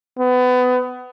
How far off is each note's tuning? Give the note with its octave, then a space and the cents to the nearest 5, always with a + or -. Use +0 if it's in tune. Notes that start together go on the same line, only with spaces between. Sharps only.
B3 +25